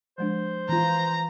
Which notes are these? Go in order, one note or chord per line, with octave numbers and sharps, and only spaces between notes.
F3 G#3 D4 C5
E3 F4 A#5